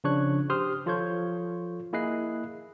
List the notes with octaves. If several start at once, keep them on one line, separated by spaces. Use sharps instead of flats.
C#3 F3 D4 C#5 C#6 F#6
G4 C5 C6 D#6 F6
F3 F4 A4 C#5 C#6 G6
A#3 E4 G#4 D#5 F#6 C7